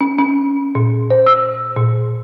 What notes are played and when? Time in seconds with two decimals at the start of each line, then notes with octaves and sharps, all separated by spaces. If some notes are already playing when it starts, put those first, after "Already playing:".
0.01 C#4
0.18 C#4
0.75 A#2
1.10 C5
1.26 E6
1.76 A#2